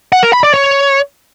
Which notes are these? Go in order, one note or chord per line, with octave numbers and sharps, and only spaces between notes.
F#5
A#4
B5
D5
C#5